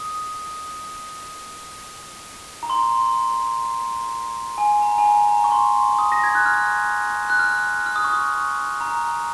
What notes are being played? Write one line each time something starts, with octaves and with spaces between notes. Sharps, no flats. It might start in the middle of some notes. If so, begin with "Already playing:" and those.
Already playing: D#6
A#5
C6
G#5
A#5
G#5
A#5
A#5
C#6
C6
D#6
A#6
G#6
F#6
F6
F#6
F6
F6
D#6
C#6
D#6
A#5